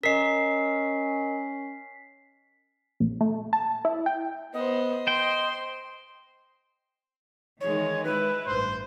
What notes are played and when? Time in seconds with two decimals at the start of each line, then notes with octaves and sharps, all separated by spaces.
0.03 C#4 A#4 D#5 B6 C7
3.00 A#1
3.21 A3
3.53 A5
3.85 E4
4.06 G5
4.54 B3 C5 D#5
5.07 C5 G5 C6
7.61 D#3 E3 G#3 C#5
8.04 G#3 E4 B4
8.46 A1 G2 C5